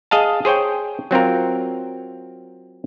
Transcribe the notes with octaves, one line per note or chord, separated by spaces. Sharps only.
G#4 D#5 F5 A5
G#4 C5 C#5 G5
F#3 C4 F4 A#4